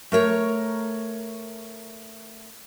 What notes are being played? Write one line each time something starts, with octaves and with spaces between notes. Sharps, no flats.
A3 A#4 C#5 A#5